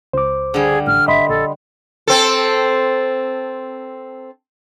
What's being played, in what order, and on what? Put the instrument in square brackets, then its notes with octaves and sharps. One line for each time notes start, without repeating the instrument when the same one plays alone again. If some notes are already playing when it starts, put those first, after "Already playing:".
[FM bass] C#2 [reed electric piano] C5 D6
[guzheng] D3 G3 [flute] G#4
[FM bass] A1 [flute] F6
[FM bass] G#1 [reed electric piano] D#5 B5 C6 [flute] E5
[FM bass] A#1 [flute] A4
[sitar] C4 A4